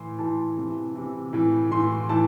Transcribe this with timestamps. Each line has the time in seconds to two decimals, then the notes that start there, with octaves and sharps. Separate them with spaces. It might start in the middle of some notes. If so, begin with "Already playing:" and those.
Already playing: A2 E3 C6
0.19 A2 E3 A5
0.57 C3 E3
0.95 C3 E3
1.33 A2 E3
1.71 A2 E3 C6
2.09 A2 E3 A5